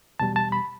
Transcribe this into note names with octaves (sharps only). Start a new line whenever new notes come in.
E2 B2 G3 A5
A5
B5